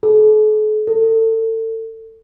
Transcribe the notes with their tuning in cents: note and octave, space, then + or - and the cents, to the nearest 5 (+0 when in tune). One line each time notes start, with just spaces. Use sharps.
A4 -45
A4 +30